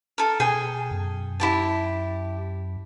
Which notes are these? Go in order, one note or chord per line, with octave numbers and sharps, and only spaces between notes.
A4 A#4
B2 G#4 G5 G#5
F#2
E4 G4 A5